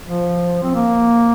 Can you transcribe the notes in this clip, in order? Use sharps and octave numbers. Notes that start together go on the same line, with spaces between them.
F3
C4
A#3